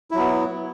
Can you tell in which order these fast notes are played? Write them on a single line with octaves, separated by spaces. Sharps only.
E4 F#3 B3